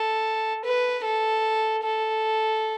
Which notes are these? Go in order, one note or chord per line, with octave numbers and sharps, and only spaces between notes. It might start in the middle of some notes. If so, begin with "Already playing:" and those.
Already playing: A4
B4
A4
A4